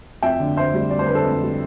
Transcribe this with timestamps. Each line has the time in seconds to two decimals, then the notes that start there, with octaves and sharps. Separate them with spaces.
0.22 F2 E5 G5
0.40 D3
0.57 F2 C5 E5
0.74 G3
0.90 F2 D5
0.99 C5
1.07 D3 B4
1.15 A4 C5
1.25 F2
1.42 G3